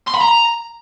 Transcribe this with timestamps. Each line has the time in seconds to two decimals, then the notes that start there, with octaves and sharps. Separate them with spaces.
0.07 C6
0.14 B5
0.21 A#5